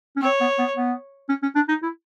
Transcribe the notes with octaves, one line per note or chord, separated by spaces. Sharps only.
C#4
C4 C#5
B3
B3
B3
C#4
C#4
D4
D#4
E4